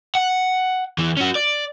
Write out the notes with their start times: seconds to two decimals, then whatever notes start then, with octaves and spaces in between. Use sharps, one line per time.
0.15 F#5
0.98 E2 E3
1.17 C#4 F#4
1.35 D5